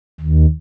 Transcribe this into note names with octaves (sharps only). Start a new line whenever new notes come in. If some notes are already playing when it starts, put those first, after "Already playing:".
D#2